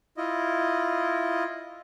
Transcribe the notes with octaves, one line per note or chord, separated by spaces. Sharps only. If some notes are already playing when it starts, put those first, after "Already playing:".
E4 F4 D#5